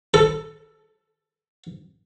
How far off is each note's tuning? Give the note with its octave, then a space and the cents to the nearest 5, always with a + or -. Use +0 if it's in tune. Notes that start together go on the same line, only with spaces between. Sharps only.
A4 +5